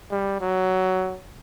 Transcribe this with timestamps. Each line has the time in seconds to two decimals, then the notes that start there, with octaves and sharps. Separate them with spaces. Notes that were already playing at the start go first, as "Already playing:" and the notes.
0.11 G3
0.40 F#3